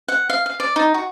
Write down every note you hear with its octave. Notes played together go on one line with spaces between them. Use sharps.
F#5
F5
F5
D5
D#4
F#4